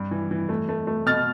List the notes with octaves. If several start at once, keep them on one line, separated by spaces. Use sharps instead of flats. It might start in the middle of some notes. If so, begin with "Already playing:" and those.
Already playing: G2
E3
E3
A3
A3
A3
B2 F6 A6